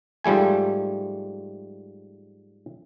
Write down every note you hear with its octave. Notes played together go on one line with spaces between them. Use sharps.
G#2 F3 G3 A3 G#5